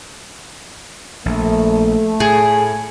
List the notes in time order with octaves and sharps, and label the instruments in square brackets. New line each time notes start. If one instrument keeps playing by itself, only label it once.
[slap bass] A#1 [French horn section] A3
[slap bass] A2 [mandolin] G#4